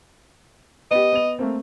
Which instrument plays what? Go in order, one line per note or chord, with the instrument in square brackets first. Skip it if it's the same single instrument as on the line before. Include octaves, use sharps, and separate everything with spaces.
[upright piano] B3 G4 [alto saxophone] D#5
[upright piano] B3 F7
A3 A#3 C4